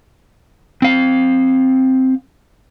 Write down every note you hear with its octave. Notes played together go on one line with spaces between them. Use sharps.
C4 F5